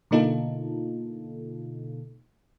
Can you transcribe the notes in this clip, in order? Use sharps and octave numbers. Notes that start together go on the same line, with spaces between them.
B2 D3 A#3 D#4 F4 A4